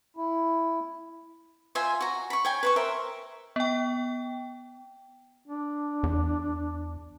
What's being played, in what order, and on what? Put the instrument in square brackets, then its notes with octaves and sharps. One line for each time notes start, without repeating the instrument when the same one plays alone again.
[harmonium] E4
[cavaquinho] F4 C5 E5 G#5
F#4 A#5
B5 C#6
C#5 G5 G#5
B4 C5 C#6
A#4 C5 E5
[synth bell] B3 G5
[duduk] D4
[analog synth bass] E2